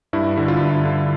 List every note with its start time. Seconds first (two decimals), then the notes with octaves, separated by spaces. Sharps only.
0.13 G2 E4
0.37 D3
0.48 F4
0.61 G2
0.85 D3